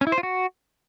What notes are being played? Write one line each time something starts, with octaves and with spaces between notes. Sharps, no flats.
C#4
E4
C5
F4
F#4